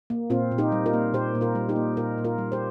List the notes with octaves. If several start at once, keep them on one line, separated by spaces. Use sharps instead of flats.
A#3
A#2 C4 F4
A#2
D#4 G4
G3
F4 A#4
A#3
A#2 G4 C5
A#2
F4 A#4
G3
D#4 G4
A#3
A#2 F4 A#4
A#2
F4 A#4
G3
G4 C5